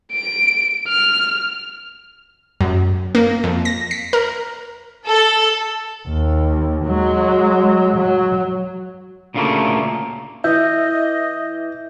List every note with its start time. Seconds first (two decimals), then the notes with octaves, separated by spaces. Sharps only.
0.12 D7
0.88 F6
2.61 F#2
3.15 A#3
3.44 F2
3.65 A#6
3.91 B6
4.13 A#4
5.07 A4
6.08 D#2
6.85 F#3 G#3
7.97 F#3
9.34 D2 A#2 C#3 F3 A3 A#3
10.44 E3 D#5 E5 G6